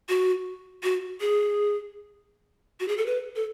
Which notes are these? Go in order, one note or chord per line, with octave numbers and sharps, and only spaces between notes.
F#4
F#4
G#4
F#4
G#4
A4
B4
A4